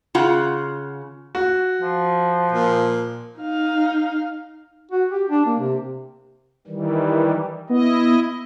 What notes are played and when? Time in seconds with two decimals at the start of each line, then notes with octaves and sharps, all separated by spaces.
0.15 C#3 F4 F#5
1.35 F#4
1.82 F3
2.52 A#2
3.39 D#4 F5
4.92 F#4
5.11 G4
5.29 D4
5.46 A#3
5.60 C3
6.67 D#3 E3 G3
7.69 B3 E4 D#5